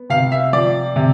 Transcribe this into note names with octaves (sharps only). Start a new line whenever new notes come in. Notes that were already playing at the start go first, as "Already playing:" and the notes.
Already playing: B3
C3 F5
E5
F3 D5
C3